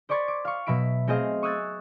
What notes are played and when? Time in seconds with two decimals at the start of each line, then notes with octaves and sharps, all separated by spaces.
0.09 C5 D5 B5 C#6 G#6 A6
0.28 D6
0.45 F5 C#6
0.66 B2 F#3 E5 B5 D7
1.07 A3 C4 G#4 C5 D#5 F5
1.43 C#6 D#6 E6 F#6 G#6 A6